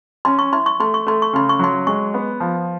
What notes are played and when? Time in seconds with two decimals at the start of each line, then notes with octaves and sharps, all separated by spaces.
0.25 C#4 C6
0.39 C#6
0.52 E4 C6
0.66 C#6
0.80 A3 C6
0.94 C#6
1.06 A3 C6
1.22 C#6
1.33 C#3 C6
1.49 C#6
1.59 F#3 C6
1.87 G#3 C#6
2.14 B3
2.40 F3